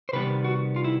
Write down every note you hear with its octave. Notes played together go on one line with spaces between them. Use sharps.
C5
C3 D#3 G3 B3 B4
F#4
F4
E4